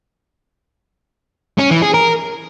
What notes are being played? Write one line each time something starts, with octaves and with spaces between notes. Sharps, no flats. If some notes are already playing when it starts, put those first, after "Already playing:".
C#4
E3
G#4
A#4